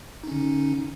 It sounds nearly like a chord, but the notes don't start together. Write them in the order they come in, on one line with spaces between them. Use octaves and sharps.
D#4 C#4 D3